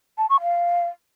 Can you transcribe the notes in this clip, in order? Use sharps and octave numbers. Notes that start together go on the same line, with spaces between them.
A5
C#6
F5